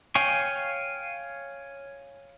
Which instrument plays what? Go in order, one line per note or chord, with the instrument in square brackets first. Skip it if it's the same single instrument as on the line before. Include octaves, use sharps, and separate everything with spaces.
[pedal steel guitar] C#5 F5 G5 G#5 C#6